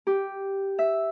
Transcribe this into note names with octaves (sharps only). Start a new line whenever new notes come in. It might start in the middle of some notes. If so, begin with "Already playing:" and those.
G4
E5